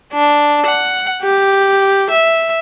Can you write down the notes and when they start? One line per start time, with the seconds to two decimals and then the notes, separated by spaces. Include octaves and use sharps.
0.12 D4
0.66 F#5
1.22 G4
2.10 E5